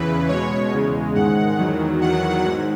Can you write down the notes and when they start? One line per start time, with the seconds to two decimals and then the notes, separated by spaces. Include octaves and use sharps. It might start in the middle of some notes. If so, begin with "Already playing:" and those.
Already playing: E2 C#3 E3 B4
0.29 B2 G#3 C#5
0.72 E2 C#3 G#3
1.15 G#2 D#3 G#3 F#5
1.58 E2 D#3 F#3
2.01 E2 D#3 F#3 F#5
2.45 G#2